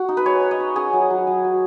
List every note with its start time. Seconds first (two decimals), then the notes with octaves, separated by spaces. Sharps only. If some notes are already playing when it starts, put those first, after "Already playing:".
Already playing: F#4
0.08 D#4
0.17 B4
0.25 G#3 C#5
0.43 D#4
0.51 D#5
0.60 D#4
0.76 C#4 G#4
0.93 F#3
1.10 F#3
1.27 F#3
1.45 F#3